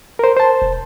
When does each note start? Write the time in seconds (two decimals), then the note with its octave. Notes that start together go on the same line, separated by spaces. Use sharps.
0.19 A#4 C5
0.37 C5 A5
0.62 E1